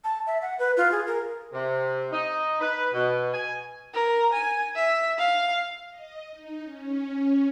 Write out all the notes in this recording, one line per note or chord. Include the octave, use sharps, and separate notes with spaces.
A5
E5
F#5
B4
F4
G#4
A#4
C3
D#4
B4
B2
G#5
A#4
G#5
E5
F5
D#5
D#4
C#4